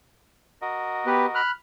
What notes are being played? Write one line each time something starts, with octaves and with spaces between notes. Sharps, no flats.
F#4 A#4 D#5
B3 G4 B4
B5 F6 F#6